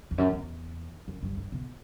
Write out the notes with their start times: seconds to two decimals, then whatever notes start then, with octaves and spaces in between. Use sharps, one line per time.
0.11 E2
0.18 F#2
0.33 E2
1.08 F#2
1.23 G2
1.37 G2
1.52 B2